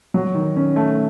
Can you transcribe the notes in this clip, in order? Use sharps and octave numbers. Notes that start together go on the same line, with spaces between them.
F#3
D#3
C#4
A3